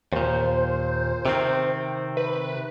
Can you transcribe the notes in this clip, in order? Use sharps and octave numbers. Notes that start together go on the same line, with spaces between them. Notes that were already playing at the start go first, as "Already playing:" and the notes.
D#2 A#2 C5
C3 D#3 C4
B4